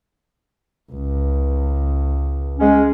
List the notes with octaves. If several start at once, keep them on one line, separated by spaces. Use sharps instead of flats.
C#2
G#3 C#4